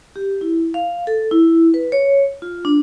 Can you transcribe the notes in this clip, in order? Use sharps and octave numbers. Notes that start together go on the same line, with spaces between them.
G4
E4
F5
A4
E4
B4
C#5
F4
D4